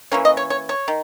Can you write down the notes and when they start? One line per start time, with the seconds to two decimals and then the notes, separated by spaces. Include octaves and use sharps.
0.12 E3 A#3 C#4 C#5
0.25 D#5
0.37 C#5
0.50 C#5
0.69 C#5
0.88 D#3